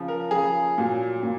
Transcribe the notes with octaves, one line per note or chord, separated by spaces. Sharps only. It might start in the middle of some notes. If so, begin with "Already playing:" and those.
Already playing: C#3 F3
A#4
C#3 F3 G#4
A#2 F#3
A#2